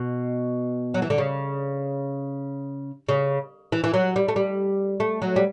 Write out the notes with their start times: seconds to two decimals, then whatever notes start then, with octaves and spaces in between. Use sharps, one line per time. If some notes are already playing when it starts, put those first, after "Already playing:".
Already playing: B2
0.94 F#3
1.02 E3
1.10 D3
1.18 C#3
3.09 C#3
3.72 E3
3.84 E3
3.94 F#3
4.16 G3
4.28 A3
4.36 G3
5.00 A3
5.22 F#3
5.36 G3